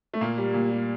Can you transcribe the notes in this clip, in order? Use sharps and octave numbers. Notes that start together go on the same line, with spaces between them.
A3
A#2 A#3
G3
A#2
G3